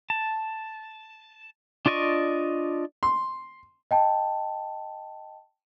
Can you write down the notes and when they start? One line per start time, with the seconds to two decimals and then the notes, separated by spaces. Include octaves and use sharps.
0.10 A5
1.86 D4 F4 D5 D#5 C#6
3.03 C6
3.91 D#5 G5 A5